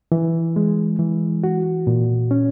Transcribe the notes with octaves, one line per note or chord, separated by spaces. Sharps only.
E3
G#3
E3
F#4
A#2
C#4